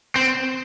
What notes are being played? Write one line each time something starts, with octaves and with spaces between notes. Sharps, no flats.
C4